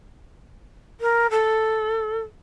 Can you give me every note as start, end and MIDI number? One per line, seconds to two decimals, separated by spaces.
1.00 1.27 70
1.30 2.20 69